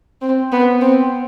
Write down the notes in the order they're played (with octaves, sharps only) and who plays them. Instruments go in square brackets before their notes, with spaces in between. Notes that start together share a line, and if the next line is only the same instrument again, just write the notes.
[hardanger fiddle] C4
B3
C4